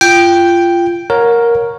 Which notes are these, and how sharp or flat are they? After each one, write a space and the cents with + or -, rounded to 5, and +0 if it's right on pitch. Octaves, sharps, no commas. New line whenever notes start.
F4 -20 G5 +0
A#4 +5 C#5 +0 F#5 -35